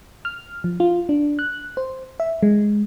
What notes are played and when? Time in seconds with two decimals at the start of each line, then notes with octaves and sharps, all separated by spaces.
0.25 F6
0.64 F3
0.80 F4
1.09 D4
1.39 F#6
1.77 C5
2.20 E5
2.43 G#3